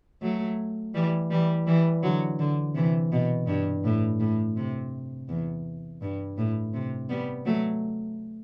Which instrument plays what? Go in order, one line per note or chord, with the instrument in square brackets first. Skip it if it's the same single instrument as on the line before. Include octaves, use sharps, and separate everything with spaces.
[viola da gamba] F#3 A3
E3 G3
E3 G3
E3 G3
D3 F#3
D3
C3 E3
B2
G2
A2
A2
C3
E2
G2
A2
C3
G3 B3
F#3 A3